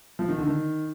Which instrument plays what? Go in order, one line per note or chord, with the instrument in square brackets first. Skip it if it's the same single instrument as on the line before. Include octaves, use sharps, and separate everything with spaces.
[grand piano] F3
D#3
D3
D#3